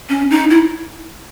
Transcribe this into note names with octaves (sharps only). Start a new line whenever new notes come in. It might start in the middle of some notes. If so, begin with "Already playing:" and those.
C#4
D#4
E4